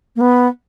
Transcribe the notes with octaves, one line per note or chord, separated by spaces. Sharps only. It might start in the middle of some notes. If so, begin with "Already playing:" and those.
A#3
B3